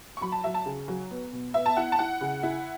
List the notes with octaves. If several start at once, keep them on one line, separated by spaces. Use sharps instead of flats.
C#6
F#3 B5
A5
F#3 E5
A5
C#3
F#3
B3
B2
B3 E5
A5
E4 F#5
A5
E4 F#5
C#3
E4